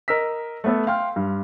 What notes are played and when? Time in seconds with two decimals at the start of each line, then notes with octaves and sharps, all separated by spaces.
0.08 A#4 D#5 E6 B6
0.64 A3 B3 A4
0.87 F5 G5 C6 F6
1.16 G2